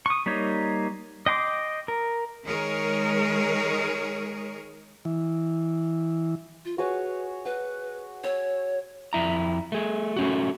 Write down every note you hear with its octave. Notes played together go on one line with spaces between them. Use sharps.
C#6 D#6
G3 A#3 D#4 C#5
D#5 G5 C6 D6
A#4
D#3 G#3 G#4 A#4 C#5
E3
F4
F#4 G#4 B4 C#5
B4 F#5
C#5 E6
F2 E4 A#5
A3 G#4
A3 C#4 F#4